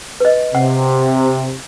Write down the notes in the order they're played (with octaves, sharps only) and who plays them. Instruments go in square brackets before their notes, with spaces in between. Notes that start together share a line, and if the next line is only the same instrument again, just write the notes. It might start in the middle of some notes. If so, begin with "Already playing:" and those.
[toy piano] B4 D#5
[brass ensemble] C3 [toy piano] F#5